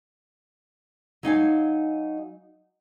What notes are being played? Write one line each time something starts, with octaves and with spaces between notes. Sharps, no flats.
F#3 D#4 F5 G#5